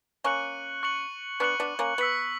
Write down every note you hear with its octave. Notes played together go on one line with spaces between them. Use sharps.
A#3 C#4 C#6 F#6 C#7 F#7
C#6 F#6 C#7 F#7
B3 D4 C#6 F#6 C#7 F#7
B3 D4
A#3 C#4
B3 E6 B6 F#7